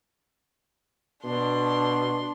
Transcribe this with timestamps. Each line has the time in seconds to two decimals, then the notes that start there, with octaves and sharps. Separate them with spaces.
1.24 B2 D4 C6